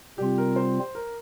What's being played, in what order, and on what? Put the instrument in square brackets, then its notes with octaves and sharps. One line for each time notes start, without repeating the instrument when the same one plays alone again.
[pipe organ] C3 G3 C4 F4 [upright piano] G4
[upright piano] A#4
C5
A#4